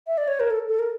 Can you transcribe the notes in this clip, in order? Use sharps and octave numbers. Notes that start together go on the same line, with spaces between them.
E5
D5
C#5
A#4
A4
A4
A#4